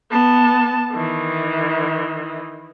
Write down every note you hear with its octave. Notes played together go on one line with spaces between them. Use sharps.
B3 A5
D#3 E3